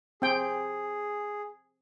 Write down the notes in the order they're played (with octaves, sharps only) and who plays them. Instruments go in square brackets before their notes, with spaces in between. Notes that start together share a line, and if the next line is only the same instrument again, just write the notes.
[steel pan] C4 G5 [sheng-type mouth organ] G#4